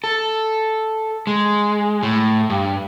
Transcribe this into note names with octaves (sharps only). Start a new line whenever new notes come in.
A4
G#3
A2
G2